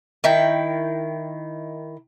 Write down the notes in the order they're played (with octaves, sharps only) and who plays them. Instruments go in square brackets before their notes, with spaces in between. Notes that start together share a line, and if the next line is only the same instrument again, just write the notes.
[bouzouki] D#3 E4 G5